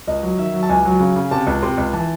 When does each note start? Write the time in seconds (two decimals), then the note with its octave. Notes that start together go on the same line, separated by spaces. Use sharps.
0.07 C#2 D#5
0.23 F#3
0.38 D#3 E5
0.54 F#3
0.63 A5
0.69 C#2 G#5
0.85 F#3
1.00 C#3
1.16 C#3
1.31 C3 A5
1.47 C#2
1.62 C3 C6
1.77 C#2
1.93 E3 A5